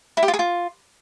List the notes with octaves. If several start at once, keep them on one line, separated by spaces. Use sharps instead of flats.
E4
G4
F4
G#4
F4